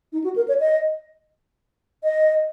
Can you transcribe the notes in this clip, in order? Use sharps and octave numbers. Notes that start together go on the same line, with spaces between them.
D#4
F#4
A#4
C#5
D#5
D#5